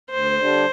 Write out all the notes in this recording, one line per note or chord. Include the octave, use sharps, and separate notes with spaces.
D2 C5
D3 G3 D4